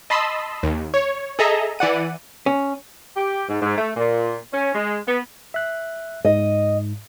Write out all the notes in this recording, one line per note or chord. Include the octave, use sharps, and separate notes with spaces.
D#5 A5 B5 C6 D#6 E6
D#2
C#5
G#4 A4 D#5 E5 A#5
E3 D5 F#5 D#7
C#4
G4
G#2
G#2
A3
A#2
C#4
G#3
B3
E5 F#6
G#2 D#5